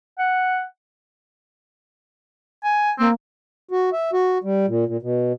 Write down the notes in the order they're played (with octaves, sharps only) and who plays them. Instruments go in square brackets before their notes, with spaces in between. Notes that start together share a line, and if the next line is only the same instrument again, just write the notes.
[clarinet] F#5
[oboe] G#5
[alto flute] A#3 [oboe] C4
[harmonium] F#4
E5
F#4
G3
A#2
A#2
B2